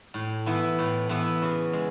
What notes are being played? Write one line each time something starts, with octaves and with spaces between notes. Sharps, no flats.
A2
E3 B3 E4
A2
E3 B3 E4
C#3
G#3